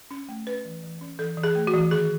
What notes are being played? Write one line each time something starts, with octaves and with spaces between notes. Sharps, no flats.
C#4
A3
C#4 B4
E3
E3
C#4
E3 A4
E3
G#4
A3
F#4
E3
D#3 G#4